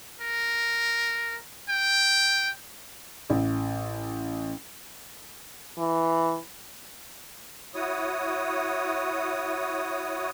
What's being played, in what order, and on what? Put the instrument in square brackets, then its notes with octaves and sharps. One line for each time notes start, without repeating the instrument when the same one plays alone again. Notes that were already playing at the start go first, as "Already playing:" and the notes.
[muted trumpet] A#4
G5
[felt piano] A1
[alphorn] E3
[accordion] E4 F#4 C#5 D#6